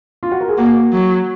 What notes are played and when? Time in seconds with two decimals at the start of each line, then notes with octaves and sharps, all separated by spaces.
0.23 F4
0.32 F#4
0.41 A#4
0.49 G#4
0.58 A#3 F#4
0.93 F#3